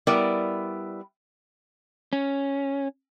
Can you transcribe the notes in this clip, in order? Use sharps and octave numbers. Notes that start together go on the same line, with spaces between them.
G3 B3 E4 A#4 D5
C#4